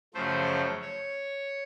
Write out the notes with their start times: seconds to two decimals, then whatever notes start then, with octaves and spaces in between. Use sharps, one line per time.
0.14 F#2 C#3 F3 A3 C5
0.82 C#5